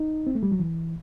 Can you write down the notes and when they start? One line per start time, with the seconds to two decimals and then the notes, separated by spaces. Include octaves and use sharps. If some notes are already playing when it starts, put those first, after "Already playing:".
Already playing: D#4
0.27 C4
0.35 A3
0.43 G3
0.52 F#3
0.60 E3